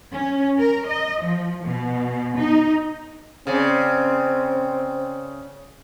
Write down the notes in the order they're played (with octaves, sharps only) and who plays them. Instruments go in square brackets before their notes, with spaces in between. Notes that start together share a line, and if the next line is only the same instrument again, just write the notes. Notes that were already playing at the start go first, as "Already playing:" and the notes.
[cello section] C#4
A#4
D#5
F3
B2
D#4
[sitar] C#3 D5 [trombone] C4